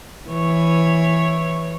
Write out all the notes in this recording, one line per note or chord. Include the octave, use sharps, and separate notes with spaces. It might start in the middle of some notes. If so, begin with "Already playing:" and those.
E3 C#5